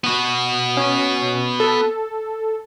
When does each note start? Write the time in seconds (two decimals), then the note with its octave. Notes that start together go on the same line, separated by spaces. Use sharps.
0.04 B3 F#4
0.77 C#4
1.60 A4